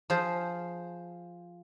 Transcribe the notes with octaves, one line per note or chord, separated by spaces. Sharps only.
F3 G#4 C5